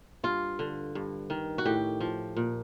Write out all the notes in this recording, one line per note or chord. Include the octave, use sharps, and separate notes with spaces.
G2 F4
D3
G2
D#3
F#4
A2 G4
F3
A#2